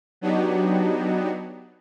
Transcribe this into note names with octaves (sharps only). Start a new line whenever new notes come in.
F#3 B3 D4 D#4 F#4 G4